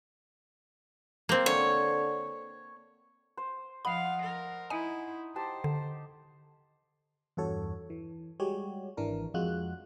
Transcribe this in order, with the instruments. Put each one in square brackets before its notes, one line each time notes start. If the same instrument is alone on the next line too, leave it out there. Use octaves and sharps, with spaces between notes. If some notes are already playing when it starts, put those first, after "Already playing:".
[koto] A#3 C4
[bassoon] D3 [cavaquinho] C#5
[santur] C5
[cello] F3 F5 [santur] D#5 F#5 [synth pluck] B5
[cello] A#4
[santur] D#4 [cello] E4 [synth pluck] G#5
[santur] G4 A5 [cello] C5
[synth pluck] D3
[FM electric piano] E2 G2 F#4 A4 C#5
E3
G3 G#3 F#4 G4 C#5
G#1 E3 D4 A#4
F2 G#3 F4 F#4 F#6